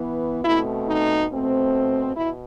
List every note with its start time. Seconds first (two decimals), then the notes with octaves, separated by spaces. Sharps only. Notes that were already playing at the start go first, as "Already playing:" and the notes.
Already playing: E3 B3
0.44 B2 A3 C4 E4
0.88 D#4
1.30 B2 A3 C4
2.15 B2 E4